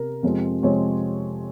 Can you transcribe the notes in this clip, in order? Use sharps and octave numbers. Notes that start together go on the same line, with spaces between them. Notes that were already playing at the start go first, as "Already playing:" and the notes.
Already playing: C3 A#4
F2 C3 F3 G#3 C4
F2 C3 F3 G#3 C4 C#5